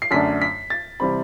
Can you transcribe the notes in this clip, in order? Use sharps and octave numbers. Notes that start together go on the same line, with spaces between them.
C7
F#2 D3 A3 D4 B6
B6
A6
C3 E3 G3 C4 B5